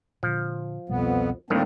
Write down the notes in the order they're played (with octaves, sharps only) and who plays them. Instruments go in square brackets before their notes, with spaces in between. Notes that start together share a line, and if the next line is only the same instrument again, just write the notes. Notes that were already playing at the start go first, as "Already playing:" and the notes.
[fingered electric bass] A#2 D3 [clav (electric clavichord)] F3
[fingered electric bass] C2 B2 G3 [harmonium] F2 B3
[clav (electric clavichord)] D2 A2 D#3 [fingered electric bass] G3 [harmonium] A#3 C4 D4